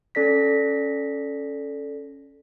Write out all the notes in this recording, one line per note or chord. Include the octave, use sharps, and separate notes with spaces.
C#4 A4 D5 A#6 B6